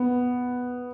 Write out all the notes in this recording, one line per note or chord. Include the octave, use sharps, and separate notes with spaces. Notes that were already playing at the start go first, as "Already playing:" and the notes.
Already playing: B3